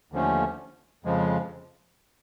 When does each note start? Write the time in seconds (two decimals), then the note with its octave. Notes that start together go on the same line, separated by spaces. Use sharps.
0.12 D#2 D3 F3 A3 C#4
1.05 F2 C#3 F3 G#3